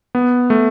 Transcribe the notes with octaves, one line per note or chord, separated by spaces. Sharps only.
B3
A3